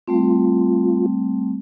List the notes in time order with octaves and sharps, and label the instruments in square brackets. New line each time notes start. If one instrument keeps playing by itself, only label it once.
[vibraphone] G3 A3 C4 [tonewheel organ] F4